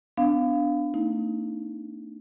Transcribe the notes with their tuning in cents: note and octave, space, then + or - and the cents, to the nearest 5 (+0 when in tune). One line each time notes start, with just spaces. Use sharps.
B3 +30 D4 +0 F5 +0
A3 +45 D#4 +25